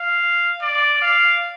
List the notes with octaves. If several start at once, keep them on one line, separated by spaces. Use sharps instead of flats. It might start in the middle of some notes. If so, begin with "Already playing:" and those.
Already playing: F5
D5
F5